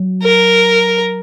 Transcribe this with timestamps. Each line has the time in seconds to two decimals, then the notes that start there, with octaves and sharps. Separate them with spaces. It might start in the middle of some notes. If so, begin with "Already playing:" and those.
Already playing: F#3
0.23 A#4